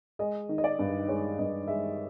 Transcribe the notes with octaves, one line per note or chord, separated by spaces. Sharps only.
G#3 D#5
D#3
D#5
D5
G2
G#3 C#5
G2 D#5
G#3 E5